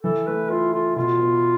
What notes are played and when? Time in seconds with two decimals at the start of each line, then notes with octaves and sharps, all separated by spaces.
0.03 E3 A4
0.27 A3 B4
0.50 E4 F4
0.73 F4 A4
0.96 B2 F4
1.20 B3